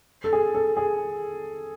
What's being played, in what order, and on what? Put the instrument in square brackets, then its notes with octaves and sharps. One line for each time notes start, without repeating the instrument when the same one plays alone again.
[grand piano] A4
G#4
A4
G#4